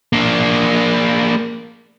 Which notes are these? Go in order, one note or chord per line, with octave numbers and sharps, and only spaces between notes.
A#3 D4